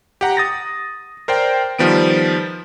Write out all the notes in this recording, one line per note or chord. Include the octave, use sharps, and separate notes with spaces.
G4 F#5 A#5
D#6 A6 A#6
A#4 C5 D5 G5
D#3 F3 G3 B3 D7